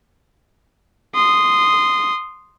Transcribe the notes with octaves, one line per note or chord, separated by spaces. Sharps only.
C6 D#6